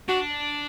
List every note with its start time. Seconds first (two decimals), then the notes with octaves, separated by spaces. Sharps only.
0.08 D4 F#4